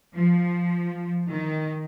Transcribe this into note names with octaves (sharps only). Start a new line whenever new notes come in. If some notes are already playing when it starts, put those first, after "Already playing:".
F3
D#3